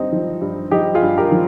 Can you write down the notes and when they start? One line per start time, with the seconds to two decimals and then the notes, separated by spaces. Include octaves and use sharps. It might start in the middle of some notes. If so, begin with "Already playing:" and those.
Already playing: G2 C4 D#4
0.12 F3
0.41 G2
0.71 F3 D#4 G4
0.95 F4 G#4
1.02 G2
1.18 G4 A#4
1.32 F3